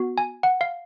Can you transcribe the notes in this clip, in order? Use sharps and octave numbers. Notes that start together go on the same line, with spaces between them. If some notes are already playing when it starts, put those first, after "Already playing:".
Already playing: B3 F#4
G#5
F#5
F5